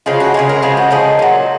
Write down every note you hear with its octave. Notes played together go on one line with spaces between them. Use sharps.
C#3 F3 G#3 F4
F#4
C#3 F3 G#3 G#4
A#4
C#3 F3 G#3 G#4
F#4
C#3 F3 G#3 D#4
A#2 F#3